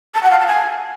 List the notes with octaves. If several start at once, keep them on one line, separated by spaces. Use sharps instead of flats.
A5
F#5
F5
A5
G#5